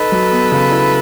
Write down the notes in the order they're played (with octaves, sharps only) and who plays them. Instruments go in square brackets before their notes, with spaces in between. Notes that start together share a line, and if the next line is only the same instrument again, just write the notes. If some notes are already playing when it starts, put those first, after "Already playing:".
Already playing: [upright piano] D#4 [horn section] A4 B4
[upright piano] F#3
B3
C#3
E4